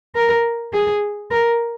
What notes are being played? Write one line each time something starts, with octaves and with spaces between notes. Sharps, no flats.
A#4
G#4
A#4